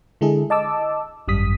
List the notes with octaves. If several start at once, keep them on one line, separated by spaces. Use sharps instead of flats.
D3 G#3 E4 G#4 A4
D#5 A5 D6 E6
G#1 F#2 G3 D#6 B6